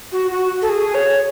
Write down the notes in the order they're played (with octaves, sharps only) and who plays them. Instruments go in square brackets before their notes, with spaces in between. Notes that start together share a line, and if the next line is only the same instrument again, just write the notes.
[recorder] F#4
F#4
A4
G#4
C#5